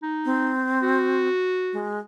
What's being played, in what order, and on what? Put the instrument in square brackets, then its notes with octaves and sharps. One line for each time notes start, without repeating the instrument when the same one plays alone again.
[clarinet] D#4
[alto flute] C4
[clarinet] F#4
[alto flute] G#3